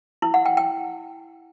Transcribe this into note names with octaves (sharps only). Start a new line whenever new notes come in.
E4
F#5
G5
G5